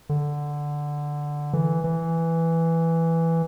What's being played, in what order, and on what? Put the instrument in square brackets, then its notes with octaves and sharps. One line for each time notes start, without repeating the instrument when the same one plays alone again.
[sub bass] D3
E3
E3